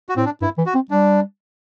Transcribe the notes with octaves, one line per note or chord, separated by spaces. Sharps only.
F#4
A2 C4
D4
G2 E4
E3
F#4
C4
G3 D4